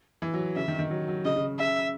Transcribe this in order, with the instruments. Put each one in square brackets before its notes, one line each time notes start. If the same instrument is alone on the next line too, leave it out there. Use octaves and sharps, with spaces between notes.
[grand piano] E3
F#3
[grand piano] C#3 [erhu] E5
[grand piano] D#3
D#3
F#3
F#3
[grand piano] C#3 [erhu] D#5
[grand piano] C#3
[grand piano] C#3 [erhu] E5